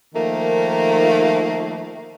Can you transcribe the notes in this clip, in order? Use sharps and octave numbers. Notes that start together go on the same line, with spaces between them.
D#3 F3 A3 A#3